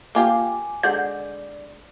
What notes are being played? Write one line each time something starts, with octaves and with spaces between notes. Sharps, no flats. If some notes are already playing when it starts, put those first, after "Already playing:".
A#3 F4 G4 G#5 D6
D3 G#3 D5 F#5 G6